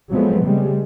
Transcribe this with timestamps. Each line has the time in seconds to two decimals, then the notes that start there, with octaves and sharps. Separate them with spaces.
0.12 F3 F#3 G#3 A3 B3 C4
0.45 C#3 G3 G#3